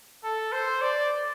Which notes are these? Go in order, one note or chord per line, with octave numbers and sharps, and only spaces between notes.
A4
C5
D5